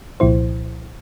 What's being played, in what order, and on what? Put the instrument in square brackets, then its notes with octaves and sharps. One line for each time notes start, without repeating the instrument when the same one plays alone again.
[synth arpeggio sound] C2 A#2 F3 E4 C5